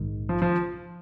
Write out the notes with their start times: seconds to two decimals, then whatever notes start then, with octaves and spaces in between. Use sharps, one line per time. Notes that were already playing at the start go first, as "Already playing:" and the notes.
Already playing: A#1 G#2 D#3
0.29 F3
0.42 F3